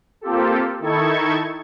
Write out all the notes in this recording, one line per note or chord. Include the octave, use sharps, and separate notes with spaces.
A#3 C4 F4 G4 A4
D#3 D#4 E4 A4 C#6 G#6